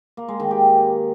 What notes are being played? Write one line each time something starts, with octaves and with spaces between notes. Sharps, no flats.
A#3
G#3
D#3
G4